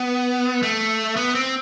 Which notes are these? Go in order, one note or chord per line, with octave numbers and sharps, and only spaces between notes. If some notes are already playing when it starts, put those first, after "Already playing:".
Already playing: B3
A3
B3
C4